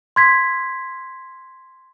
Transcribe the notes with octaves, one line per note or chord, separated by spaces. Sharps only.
C6 G#6 B6